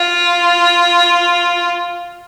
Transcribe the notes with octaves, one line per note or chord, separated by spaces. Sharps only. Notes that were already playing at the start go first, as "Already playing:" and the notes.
Already playing: F4